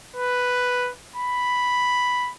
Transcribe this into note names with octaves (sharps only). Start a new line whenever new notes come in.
B4
B5